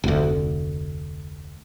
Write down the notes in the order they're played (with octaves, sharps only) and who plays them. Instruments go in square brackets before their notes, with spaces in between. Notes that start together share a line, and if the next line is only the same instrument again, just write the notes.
[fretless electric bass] F1 D2